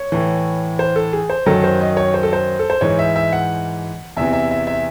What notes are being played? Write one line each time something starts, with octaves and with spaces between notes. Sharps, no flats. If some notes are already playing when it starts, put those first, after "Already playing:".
Already playing: C#5
A2 E3
C5
A4
G#4
C5
F#2 D#3 F#3 A4
C5
D#5
C#5
C5
A4
C5
A4
C5
G#2 E3 C#5
E5
E5
F#5
E2 C3 E3 E5
E5
E5
E5